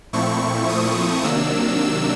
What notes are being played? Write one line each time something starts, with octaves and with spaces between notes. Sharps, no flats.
A#2 F3 A3 C4 E4 C#6
D#6
C3 D#3 F#3 A#3 D4 E6
E6